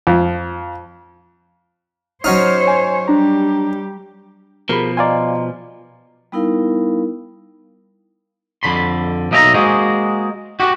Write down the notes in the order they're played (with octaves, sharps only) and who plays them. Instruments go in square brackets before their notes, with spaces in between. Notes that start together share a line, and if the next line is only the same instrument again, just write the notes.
[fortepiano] F2
[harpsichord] F#3 C#4 D#4 [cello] C5 C#5 [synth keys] F6 C7
[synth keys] G#5
[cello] G3 G4 [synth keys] D4 A#5
[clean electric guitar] B2 F3 [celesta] G4 G#4 [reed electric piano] A#4 B5
[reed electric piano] D5 F5 G#5 [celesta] D#5 A#5 C6
[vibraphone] G3 B3 D#4 E4 A#4 F5
[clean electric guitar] F2 D3 B5 C6
B1 A#3 D#5 E5 G5 A#5
G#3 A#3 F#4 G#4 C5
F#4 G4 F#5